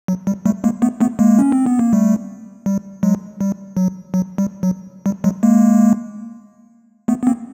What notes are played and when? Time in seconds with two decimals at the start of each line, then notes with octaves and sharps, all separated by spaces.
0.08 F#3
0.27 G3
0.46 G3 A3
0.64 G#3 A#3
0.82 A3 B3
1.01 A3 B3
1.19 G#3 A#3
1.39 C#4
1.52 C4
1.66 B3
1.79 A#3
1.93 G3 A3
2.66 G3
3.03 F#3 G#3
3.41 G3
3.77 F#3
4.14 F#3
4.38 G3
4.63 F#3
5.06 G3
5.24 F#3 G#3
5.43 G#3 A#3
7.08 A3 B3
7.23 B3
7.27 A#3 C4